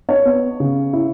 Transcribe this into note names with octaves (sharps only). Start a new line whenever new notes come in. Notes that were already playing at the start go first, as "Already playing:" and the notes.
C#5
B3
C#3
E4